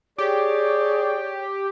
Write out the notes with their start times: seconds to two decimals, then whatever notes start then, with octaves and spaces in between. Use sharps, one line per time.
0.18 G4 G#4 C#5 D5